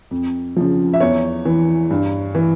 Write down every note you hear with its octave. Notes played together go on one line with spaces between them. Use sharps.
F2
C#3 F3
E5
E2 C#5
E3
G2
E3